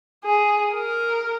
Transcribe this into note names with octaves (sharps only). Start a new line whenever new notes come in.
G#4
A#4